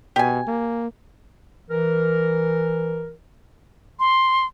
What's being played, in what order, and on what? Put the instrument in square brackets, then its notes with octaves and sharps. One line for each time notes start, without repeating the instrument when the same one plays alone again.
[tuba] B2 [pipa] G4 G#5
[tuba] A#3
[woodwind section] E3 A#4
[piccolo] C6